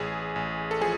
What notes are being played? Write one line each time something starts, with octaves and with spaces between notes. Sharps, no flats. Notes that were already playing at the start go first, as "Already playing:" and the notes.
Already playing: A1 G#4
A1
A4
F3 G#4